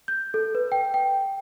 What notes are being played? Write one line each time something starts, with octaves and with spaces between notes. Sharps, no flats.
G6
A4
B4
G5
G5